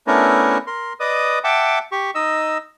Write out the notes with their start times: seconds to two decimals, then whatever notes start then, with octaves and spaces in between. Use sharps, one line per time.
0.07 A3 B3 C#4 D4 E4 A#4
0.67 A#4 C6
1.00 B4 D5 D#5 D#6
1.44 E5 F#5 G5 A5 D6
1.92 G4 C#6
2.15 D#4 D#5 E6